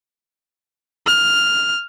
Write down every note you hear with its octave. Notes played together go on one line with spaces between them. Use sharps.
F6